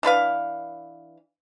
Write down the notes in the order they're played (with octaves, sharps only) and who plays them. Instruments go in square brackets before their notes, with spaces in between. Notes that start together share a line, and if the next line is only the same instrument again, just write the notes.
[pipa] E3 D4 B4 F5